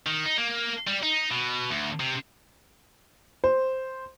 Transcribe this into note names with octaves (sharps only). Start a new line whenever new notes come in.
D#3
D#4
A#3
G3
D#4
B2
D2
C3
C5